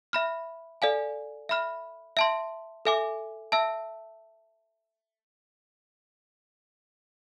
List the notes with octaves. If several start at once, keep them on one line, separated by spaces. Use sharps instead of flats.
E5 B5 F6
A4 D5 F5 G#5
E5 B5 F6
E5 A5 C6
A4 E5 G#5 D6
E5 A5 E6